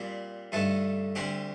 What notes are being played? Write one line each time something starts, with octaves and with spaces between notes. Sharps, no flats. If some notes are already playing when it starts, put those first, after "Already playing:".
Already playing: A#2 G3 C4
G2 D3 A3 D#4 A4
D2 D3 G3 C4 G4